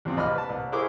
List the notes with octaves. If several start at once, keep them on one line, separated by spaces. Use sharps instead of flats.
E2 F3 C4
C2 D#5 B5 D6 F6
B4 A5
C2
E4 G#4 A#4 C5 C#6 D6